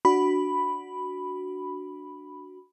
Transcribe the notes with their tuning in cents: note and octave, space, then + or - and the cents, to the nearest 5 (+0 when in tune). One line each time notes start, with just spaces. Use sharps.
D4 +0 F#4 +0 B5 +0